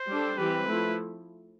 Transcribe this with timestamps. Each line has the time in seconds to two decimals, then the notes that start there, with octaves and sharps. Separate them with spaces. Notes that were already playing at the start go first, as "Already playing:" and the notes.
Already playing: C5
0.10 G3 D4 A4
0.38 E3 G3 C4 G4 B4
0.67 F3 A3 E4